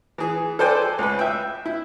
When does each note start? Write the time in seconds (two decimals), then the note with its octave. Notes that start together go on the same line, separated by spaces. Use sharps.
0.18 E3 G#4
0.59 A4 B4 C5 D5 G5 G#5
0.98 C#2 B4
1.19 E5 G5
1.66 E4